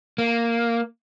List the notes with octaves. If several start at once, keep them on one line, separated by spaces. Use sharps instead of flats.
A#3